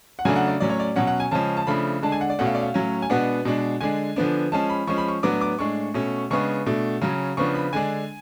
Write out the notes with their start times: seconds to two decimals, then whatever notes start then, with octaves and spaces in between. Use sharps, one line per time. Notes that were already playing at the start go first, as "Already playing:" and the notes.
0.19 F#5
0.25 C#3 F#3 A3 D4 G#5
0.36 F#5
0.48 D5
0.60 A2 F#3 C#4 D5
0.70 C#5
0.80 D5
0.96 B2 F#3 C#4 F#5
1.07 F#5
1.20 G#5
1.31 C#3 F3 G#3 C#4 A5
1.57 A5
1.67 C#3 F3 A3 D4 B5
2.02 D3 G#3 D4 A5
2.12 G#5
2.21 F#5
2.30 D5
2.39 B2 A3 C#4 F#5
2.46 F5
2.55 D5
2.62 F5
2.74 A2 F#3 C#4
3.02 G#5
3.10 B2 G#3 B3 D4 F#5
3.45 B2 G#3 D4
3.81 D3 G#3 D4 G#5
4.16 D3 F3 B3 D4
4.52 F3 G#3 C#4 A5
4.70 B5
4.87 F3 G#3 C#4 C#6
4.98 B5
5.08 C#6
5.23 A2 F#3 B3 D4 D6
5.41 D6
5.59 A2 G#3 D4 C#6
5.94 B2 A3 C#4
6.30 C#3 G#3 B3 D4 C#6
6.66 B2 A3 D4
7.01 C#3 F#3 C#4
7.37 C#3 F3 B3 D4 C#6
7.55 B5
7.73 D3 G#3 D4 G#5